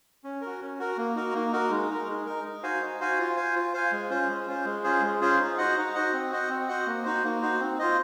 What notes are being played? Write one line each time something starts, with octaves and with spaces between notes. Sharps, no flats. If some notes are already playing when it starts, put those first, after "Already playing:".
C#4
A#4
F#4
C#4
F#4 A#4
A#3
D#4 F#4 A#4
A#3
D#4 F#4 A#4
G#3
D#4 A#4
G#3
D#4 A#4
D#4
F#4 C5 F5 G#5
D#4
F#4 C5 F5 G#5
F4
C5 F5 G#5
F4
C5 F5 G#5
G#3
C#4 F4 C5
G#3
C#4 F4 C5
G#3
C#4 F4 G#4 C5
G#3
C#4 F4 G#4 C5
D#4
F#4 C5 D#5 F#5
D#4
F#4 C5 D#5 F#5
C4
F#4 C5 D#5 F#5
C4
F#4 C5 D#5 F#5
A#3
D#4 F#4 C5
A#3
D#4 F#4 C5
C4
F4 C5 D#5